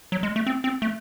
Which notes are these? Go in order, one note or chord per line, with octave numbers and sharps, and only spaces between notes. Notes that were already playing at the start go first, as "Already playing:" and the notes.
F#3
G#3
A3
C4
C4
A3